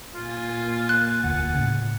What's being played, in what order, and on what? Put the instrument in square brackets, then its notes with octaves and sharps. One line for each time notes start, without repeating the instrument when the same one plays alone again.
[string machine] A#2 G#5 A6 [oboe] F4
[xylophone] F#6
[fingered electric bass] E1 D2 [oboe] F#5
[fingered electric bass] A2 C#3